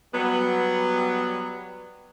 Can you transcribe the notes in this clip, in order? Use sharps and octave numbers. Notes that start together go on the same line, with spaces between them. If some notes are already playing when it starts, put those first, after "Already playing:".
F#3 G3 B3